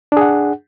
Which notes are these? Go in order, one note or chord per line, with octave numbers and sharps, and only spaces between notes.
D4 G#4 F#5